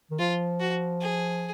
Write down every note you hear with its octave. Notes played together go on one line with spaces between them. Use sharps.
D#3
F3 F4
F#4
G#4